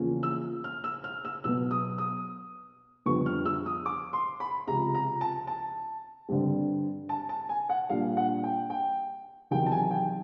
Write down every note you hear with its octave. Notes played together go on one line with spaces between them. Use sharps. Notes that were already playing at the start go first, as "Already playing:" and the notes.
Already playing: E2 C#3 F3 A#3 C#4
E6
F6
E6
F6
E6
B2 F#3 B3 E6
D#6
D#6
F2 D3 G3 B3 C#6
F6
E6
D#6
D6
C6
B5
C#2 C3 F3 A#5
A#5
A5
A5
G2 D3 G3 C4
A5
A5
G#5
F#5
A#2 G3 A#3 D4 F5
F#5
G5
G5
E2 C3 D#3 F#3 G5
A5
G#5
G5